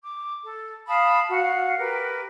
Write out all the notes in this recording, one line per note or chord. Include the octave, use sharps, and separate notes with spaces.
D6
A4
F5 A5 B5 D#6
F#4 F5 F#5
G4 A#4 B4